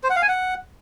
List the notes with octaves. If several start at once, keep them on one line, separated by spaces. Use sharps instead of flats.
C5
F#5
F5
G#5
F#5